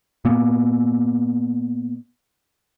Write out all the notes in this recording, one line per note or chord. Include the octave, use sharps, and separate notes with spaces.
A#2 A#3 B3